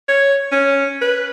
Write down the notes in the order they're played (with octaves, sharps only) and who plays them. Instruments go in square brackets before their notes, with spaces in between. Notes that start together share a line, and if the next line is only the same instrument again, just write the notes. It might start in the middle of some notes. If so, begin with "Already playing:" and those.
[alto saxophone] C#5
C#4
B4